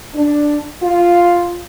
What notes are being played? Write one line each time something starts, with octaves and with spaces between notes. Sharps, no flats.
D4
F4